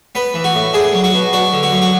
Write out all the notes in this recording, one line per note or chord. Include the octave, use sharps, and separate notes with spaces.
B3 B4
E3
F#4
A2
D4 G#4
F#3
F#4
B2
D4 F#4
D3
F#4
F#2
F#4